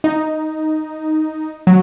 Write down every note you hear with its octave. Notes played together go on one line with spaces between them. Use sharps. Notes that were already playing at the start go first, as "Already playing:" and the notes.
D#4
F#3